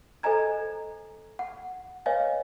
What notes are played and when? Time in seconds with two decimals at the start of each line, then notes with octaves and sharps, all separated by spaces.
0.23 A4 C5 D#5 G#5 A#5 G#6
1.39 F#5
2.06 B4 C#5 D#5 F5 G#5